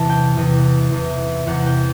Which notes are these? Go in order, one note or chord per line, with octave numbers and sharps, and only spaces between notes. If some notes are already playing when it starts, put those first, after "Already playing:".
Already playing: E2 C3 E3 A5
G5
E2 C3 E3
E2 C3 E3
E2 C3 E3 F#5
G5